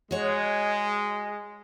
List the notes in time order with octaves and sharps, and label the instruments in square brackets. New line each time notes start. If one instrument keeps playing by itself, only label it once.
[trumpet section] G#3 [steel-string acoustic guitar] F#4 C#5